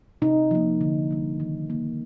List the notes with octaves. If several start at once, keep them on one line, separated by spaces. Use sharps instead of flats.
C3 D#4
F3 A#3
D3
G3 A#3
D#3
A#3